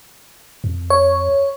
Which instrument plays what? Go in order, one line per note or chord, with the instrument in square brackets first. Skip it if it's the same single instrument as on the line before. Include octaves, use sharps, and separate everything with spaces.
[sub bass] F2
[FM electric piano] C#5